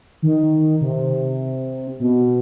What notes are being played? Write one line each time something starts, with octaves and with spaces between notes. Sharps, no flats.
D#3
C3
B2